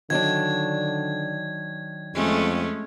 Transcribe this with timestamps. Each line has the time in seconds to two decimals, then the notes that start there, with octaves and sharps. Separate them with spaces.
0.10 D3 D#3 F#3 D4 G#6
2.15 F2 G#3 A3 C#4